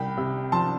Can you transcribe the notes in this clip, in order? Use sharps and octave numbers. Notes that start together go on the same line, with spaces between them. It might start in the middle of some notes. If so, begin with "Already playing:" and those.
Already playing: C2 G5 B5
C3
F3 A5 C6